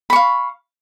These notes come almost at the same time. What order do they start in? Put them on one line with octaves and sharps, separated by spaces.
B5 C#6 F5